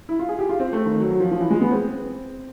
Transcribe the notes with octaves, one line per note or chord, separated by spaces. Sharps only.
E4
F4
G#4
G4
F4
C4
A3
D#3
F#3
F#3
F3
F3
E3
G#3
B3
C4